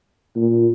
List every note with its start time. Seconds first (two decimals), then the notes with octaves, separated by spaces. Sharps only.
0.36 A#2